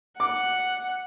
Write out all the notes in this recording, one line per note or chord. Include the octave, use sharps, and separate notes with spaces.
F#5 D6